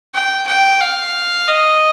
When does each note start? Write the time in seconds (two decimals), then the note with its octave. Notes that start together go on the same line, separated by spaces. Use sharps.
0.14 G5
0.47 G5
0.81 F5
1.48 D#5